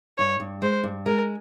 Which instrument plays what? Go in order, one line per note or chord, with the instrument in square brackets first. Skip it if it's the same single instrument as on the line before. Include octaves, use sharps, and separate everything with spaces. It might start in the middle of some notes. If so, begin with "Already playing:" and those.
[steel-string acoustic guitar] G2 [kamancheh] C#5
[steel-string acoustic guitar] G2
[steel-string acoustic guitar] G#3 [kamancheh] C5
[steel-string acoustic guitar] G2
[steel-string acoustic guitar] G#3 [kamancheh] A#4